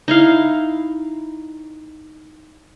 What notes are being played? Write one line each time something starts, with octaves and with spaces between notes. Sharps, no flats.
D#4 E4 F5